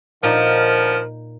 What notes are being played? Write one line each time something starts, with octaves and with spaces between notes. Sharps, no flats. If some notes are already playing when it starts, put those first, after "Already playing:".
A#2 D3 F3 D#4 A#4